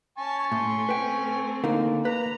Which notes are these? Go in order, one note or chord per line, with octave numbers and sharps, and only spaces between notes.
C#5 G#5 A5 C#6
A2 A3 C6
A3 C4 B4 G5
D3 A#3 D#4
B4 A#5